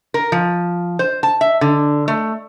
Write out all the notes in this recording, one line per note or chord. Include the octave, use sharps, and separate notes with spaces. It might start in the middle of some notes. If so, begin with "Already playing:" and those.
A#4
F3
C5
A5
E5
D3
A3